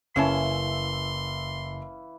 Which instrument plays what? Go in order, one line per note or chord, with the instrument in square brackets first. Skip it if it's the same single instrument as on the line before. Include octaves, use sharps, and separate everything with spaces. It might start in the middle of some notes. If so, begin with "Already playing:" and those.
[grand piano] F#1 [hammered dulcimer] E3 E5 F5 [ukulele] C#4 C#5 A5 [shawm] C6